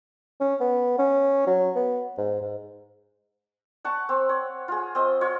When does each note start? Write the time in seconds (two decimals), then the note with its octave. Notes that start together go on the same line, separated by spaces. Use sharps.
0.41 C#4
0.60 B3
0.98 C#4
1.47 F#3
1.76 B3
2.18 G#2
2.42 G#2
3.84 F#5 A5 C#6
4.09 C4
4.29 C#5
4.68 F4 G#4
4.95 C4 D#5
5.21 F4 C#5